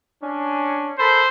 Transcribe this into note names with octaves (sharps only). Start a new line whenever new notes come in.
C#4 D4 G#5
A4 A#4 C5 B5